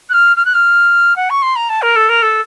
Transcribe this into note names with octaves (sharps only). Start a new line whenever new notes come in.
F#6
F6
F6
F#6
F6
F#5
C#6
C6
A#5
A5
A#4
A4
A#4
A4